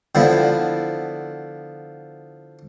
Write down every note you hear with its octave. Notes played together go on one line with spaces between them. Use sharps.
D3 F3 B3 E4